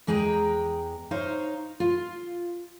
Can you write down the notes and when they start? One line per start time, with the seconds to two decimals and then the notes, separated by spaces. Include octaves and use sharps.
0.07 E2 G#3 G#4 G5 A#5
1.11 D#4 C5 C#5 F5
1.80 F4